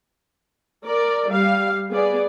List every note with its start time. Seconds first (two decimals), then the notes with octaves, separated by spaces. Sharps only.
0.86 A#4 D5
1.31 G3 F5
1.91 B3 G#4 D5